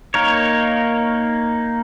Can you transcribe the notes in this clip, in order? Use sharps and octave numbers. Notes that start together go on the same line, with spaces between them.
A#3 D#4 A#4 C#5